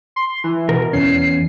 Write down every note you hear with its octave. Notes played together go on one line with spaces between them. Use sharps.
C6
E3
B2 A#4
E2 C#4 C7